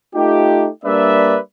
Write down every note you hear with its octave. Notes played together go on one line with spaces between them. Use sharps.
A3 D#4 F4 G4
G3 A#3 D4 B4 D5 E5